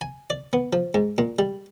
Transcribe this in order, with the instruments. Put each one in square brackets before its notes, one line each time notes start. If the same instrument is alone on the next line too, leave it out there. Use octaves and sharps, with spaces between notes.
[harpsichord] G#5
D5
B3
F3
G#2
A#2
G3